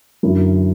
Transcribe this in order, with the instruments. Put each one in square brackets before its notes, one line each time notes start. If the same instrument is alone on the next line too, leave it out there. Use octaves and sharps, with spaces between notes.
[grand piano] F#2 D3 F#3 E4